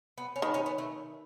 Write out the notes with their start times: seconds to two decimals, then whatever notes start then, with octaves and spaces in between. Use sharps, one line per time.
0.18 B3
0.36 C#4
0.42 D#3 B3
0.54 C#4
0.66 B3
0.78 A3